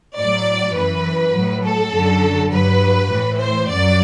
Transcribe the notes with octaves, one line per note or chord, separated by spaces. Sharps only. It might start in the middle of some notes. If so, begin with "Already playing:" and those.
A2 F#3 D5
F#2 E3 B4
A2 F#3
A4
F#2 D3 F#3
G2 F#3 B4
A2 E3
C5
F#2 F#3 D5